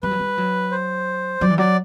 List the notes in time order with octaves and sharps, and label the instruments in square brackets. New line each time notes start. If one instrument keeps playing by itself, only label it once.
[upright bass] G3 [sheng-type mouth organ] B4
[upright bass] F#3
G3
F#3
[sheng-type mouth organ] C5
[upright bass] F#3 [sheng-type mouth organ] D5
[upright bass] E3
[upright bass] F#3 [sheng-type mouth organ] D5